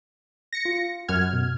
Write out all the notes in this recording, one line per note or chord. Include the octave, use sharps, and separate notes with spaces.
A#6 C#7
F4
F#2 F#5 F6 G#6
B2